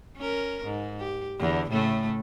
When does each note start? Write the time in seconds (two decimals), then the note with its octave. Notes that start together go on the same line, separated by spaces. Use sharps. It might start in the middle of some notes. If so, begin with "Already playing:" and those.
0.17 C#4 A#4
0.65 G#2
0.99 G4
1.39 E2 D3
1.70 A2 C#3 A3